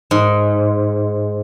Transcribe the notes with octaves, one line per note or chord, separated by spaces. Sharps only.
G#2